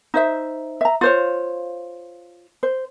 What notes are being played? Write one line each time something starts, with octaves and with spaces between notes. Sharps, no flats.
D#4 C5 E5
E5 A#5
F4 C5 C#5
C5